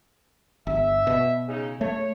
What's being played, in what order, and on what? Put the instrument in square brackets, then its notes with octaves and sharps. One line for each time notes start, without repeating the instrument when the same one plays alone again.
[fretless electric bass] G1 [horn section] E5
[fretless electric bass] B2
[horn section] C#3 D#4
[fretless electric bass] A3 [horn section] C#5